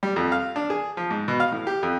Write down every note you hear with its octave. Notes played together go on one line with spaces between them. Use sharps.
G3
F2
F5
D4
G#4
F3
G#2
B2
F5
A2
G4
F2